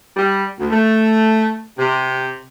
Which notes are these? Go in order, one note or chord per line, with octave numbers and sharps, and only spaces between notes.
G3
D2
A3
C3